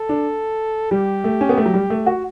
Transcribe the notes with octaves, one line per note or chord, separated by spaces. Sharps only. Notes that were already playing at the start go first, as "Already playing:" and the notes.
Already playing: A4
D4
G3 G4
A3
C#4
B3
A3
F#3
G3
A3
F#4